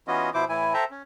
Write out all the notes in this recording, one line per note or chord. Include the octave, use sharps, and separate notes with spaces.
E3 B3 C#4 F4 F#4 D#5
B2 F3 E4 C5 D6
A2 E3 E4 G#5
A4 C5 E5 G5 A5 A#5
C#4